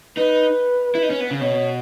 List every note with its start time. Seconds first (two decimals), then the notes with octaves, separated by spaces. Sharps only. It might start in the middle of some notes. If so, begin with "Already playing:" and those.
0.17 D#4 B4
0.95 E4
1.03 D#4
1.11 C#4
1.20 B3
1.31 C#3
1.41 B2 C#5